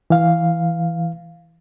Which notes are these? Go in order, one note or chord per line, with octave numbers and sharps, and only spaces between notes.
E3 F5